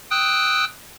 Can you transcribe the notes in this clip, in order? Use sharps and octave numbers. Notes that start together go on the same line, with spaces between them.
G5 D#6 E6 F#6